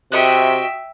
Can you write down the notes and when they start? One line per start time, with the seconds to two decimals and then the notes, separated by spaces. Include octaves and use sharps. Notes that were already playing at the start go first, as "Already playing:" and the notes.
0.12 C3 F#4 D#5 E5 G5 C#6